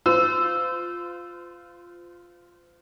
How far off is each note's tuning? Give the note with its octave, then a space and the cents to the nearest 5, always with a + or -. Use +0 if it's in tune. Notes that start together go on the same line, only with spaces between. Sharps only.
F4 +0 C5 -40 E6 +0